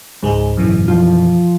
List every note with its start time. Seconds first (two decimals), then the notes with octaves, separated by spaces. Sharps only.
0.23 C#2 G#2 G#3 G#4
0.57 F#2 B2 E3
0.88 F3 F4